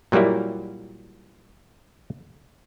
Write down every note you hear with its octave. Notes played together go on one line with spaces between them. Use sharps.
A#2 F#3 G3 A#3 E4